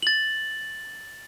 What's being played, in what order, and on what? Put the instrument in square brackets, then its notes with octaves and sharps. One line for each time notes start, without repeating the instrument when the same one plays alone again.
[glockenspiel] A6 F#7